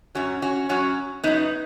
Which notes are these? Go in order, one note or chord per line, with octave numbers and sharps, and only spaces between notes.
F#2 F#3 C#4 F#4
C#4 F#4
F#2 F#3 C#4 F#4
F#2 F#3 B3 D#4